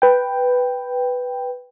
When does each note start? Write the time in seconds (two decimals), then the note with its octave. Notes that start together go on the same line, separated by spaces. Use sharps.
0.02 B4 G5